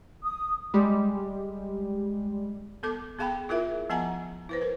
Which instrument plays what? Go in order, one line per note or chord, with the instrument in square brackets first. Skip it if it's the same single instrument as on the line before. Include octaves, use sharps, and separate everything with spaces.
[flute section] D#6
[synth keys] G3 G#3 G4
[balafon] B3 A4 D6
B3 G#4 F5 G5 B5
E4 F4 G#4 A#4 E5
F3 B3 F#5 G#5 A#5
E4 B4 C5
A#4